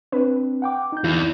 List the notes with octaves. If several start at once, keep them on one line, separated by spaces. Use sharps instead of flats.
C4 D4 B4
F#5 G5 D6
D#4 G6
E2 E4